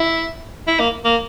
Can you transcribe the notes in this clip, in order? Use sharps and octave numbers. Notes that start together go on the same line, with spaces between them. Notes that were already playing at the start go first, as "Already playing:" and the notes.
Already playing: E4
E4
A#3
A#3